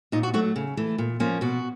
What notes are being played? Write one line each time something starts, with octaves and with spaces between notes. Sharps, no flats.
A#2 D#4
F#4
F#3 A3 F#4
C#3
E3 A3
A#2
F3 A#3 C#4
B2 F#4